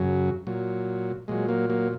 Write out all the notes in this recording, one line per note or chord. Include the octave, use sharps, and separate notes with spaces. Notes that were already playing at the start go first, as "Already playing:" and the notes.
Already playing: F#2 C#3 F#3
A#2 F#3
A#2 F#3 G#3
F#3 A#3
F#3 A#3